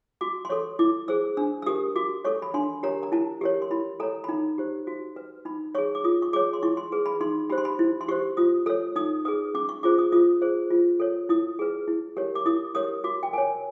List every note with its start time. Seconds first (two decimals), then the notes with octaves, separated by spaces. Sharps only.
0.21 F#4 D6
0.45 C6
0.50 A4 C#5 C#6
0.79 E4 D6
1.08 G#4 C5 E6
1.37 D4 E6
1.62 E6
1.66 G4 A#4 D#6
1.96 F#4 D6
2.25 A4 C#5 C#6
2.42 B5
2.54 D4 C6
2.83 G4 A#4 C#5 A#5
3.03 A#5
3.12 E4 A5
3.41 G4 A#4 C#5
3.62 C6
3.71 E4 B5
4.00 A4 C#5 A#5
4.24 B5
4.29 D#4 A#5
4.58 G4 C5
4.87 F#4
5.16 B4
5.45 D#4 B5
5.75 G#4 C#5 C#6
5.95 D6
6.04 F4 D#6
6.22 C#6
6.33 G#4 C#5 D6
6.53 C6
6.63 E4 C#6
6.77 C6
6.92 G#4 B4
7.06 B5
7.21 D#4 C6
7.50 G4 C5 B5
7.58 C6
7.65 B5
7.79 E4
8.01 C6
8.08 G4 C5 C#6
8.37 F4 D#6
8.66 A4 C#5 E6
8.96 D#4 D#6
9.25 G#4 B4 D#6
9.54 C#4 D6
9.69 C#6
9.83 F4 G#4 C5 D6
9.98 D#6
10.12 F4 D#6
10.42 G#4 C5
10.70 F4
11.00 A4 C#5
11.29 E4 D#6
11.59 G#4 B4
11.88 E4
12.17 G4 A#4 C#5
12.35 D6
12.46 E4 D#6
12.75 G4 A#4 C#5 D#6
13.04 F#4 D6
13.23 G5
13.33 A#4 C#5 G#5